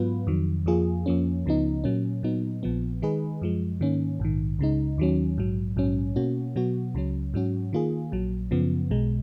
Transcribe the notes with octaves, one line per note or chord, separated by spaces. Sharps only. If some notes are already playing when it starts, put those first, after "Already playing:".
Already playing: G#2 F#3 B3 F4 B4
F2 D#3 F#3
F2 F3 A#3 F4 G#4
F2 F3 A#3 C#4
C#2 C#3 F3 B3 D#4
A#2 F#3 A#3 C#4
A#2 F#3 B3 D#4
A#1 A#2 F3 B3
D#3 G#3 D#4 G#4 B4
F#2 F3 G#3
G#2 D#3 A#3 C#4
A#1 G#2 D#3
C#2 C#3 G#3 D#4
D#2 D#3 F#3 C#4
A#1 G#2 F#3
A#1 G#2 F#3 C#4
B2 A#3 C#4 F#4
B2 F#3 B3 F#4
C#2 C#3 F#3 C#4
G#2 F#3 C#4 F#4
D#3 A#3 F4 G#4
A#1 A#2 F#3
F#2 C#3 F3 B3
B1 B2 G#3